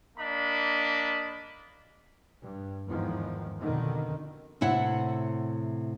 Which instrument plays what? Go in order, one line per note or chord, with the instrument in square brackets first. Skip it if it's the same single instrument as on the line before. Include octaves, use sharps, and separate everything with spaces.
[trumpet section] A#3 D4 D#5 B5
[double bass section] G2
E2 G#2 D#3 F3
F2 B2 D3 D#3
[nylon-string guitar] A2 C3 E4 F#5